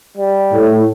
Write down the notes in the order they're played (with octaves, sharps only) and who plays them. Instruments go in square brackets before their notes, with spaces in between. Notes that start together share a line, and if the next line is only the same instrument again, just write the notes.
[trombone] G3
[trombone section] A2